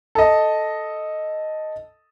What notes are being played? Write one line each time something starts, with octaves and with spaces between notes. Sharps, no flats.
A4 D#5